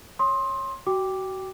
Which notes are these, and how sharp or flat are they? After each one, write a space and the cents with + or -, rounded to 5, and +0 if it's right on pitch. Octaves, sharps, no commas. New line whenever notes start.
C#5 +0 C6 +20 D#6 +20
F#4 +30 G5 +10 D6 +0